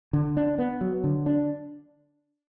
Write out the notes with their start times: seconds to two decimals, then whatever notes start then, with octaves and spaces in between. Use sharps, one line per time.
0.13 D3
0.37 D4
0.58 B3
0.81 F#3
1.04 D3
1.26 D4